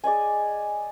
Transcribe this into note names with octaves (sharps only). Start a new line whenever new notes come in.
G#4 D5 D#5 G#5